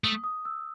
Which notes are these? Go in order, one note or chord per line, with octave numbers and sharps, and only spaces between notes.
A3 D#6
D#6
E6